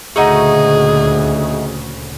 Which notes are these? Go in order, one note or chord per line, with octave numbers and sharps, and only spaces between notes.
D2 A#2 C#3 A3 D#4 F#4 G#4